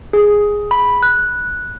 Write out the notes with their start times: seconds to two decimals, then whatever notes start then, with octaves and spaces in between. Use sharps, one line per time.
0.13 G#4
0.71 B5
1.03 F#6